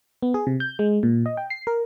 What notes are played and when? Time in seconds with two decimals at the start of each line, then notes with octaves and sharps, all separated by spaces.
0.22 B3
0.34 G#4
0.47 C3
0.60 G6
0.79 G#3
1.03 A#2
1.26 D#5
1.37 G5
1.50 C7
1.67 A#4